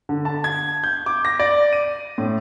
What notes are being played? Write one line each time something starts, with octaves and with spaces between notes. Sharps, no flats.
D3
A5
G#6
G6
D6
A#6
D5
D#7
A2